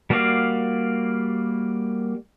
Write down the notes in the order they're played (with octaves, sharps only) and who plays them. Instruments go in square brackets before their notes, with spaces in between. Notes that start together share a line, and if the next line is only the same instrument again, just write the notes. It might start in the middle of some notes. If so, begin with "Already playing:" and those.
[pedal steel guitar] G3 A#3 F#4 D5 F5